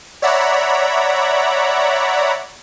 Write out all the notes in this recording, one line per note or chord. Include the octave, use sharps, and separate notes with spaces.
C#5 D5 E5 F#5 A#5 B5